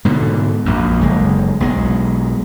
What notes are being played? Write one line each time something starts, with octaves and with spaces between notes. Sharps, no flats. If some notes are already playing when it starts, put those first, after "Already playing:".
G#2 B2 D3
A#1 F#2
F#1 G#3
B1 G#3